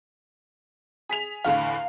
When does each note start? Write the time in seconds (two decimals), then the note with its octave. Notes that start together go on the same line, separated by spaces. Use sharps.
1.09 G#4 B6 F7
1.45 E2 A2 D3 F5